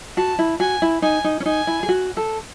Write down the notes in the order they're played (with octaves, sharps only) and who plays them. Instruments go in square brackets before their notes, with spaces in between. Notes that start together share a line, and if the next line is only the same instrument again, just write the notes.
[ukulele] F#4 [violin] A5
[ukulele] E4
[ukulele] F#4 [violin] G#5
[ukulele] E4
[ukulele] D#4 [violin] G#5
[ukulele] D#4
C#4
[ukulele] D#4 [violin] G#5
[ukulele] E4
G#4
F#4
A4